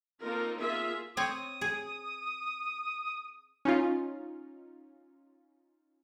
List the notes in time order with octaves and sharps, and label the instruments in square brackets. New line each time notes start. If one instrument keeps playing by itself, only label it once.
[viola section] A#3 C4 D#4 F4 A4 A#4
A#3 F4 G#4 E5
[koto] C4 C#5 [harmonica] D#6
[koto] G#4
[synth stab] C#4 D#4 F4